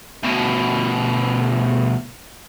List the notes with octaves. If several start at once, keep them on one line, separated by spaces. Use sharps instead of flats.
D2 B2